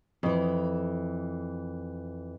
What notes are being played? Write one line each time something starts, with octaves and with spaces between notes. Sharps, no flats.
F2 E3